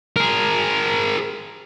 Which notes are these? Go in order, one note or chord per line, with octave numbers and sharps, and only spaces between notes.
G#4 A#4